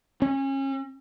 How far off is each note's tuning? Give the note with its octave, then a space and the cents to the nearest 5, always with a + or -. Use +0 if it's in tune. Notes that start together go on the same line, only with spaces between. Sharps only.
C#4 -30